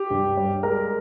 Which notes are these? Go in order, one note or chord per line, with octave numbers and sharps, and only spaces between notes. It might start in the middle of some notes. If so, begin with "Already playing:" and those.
Already playing: G4
G2
G3
G#3 A#4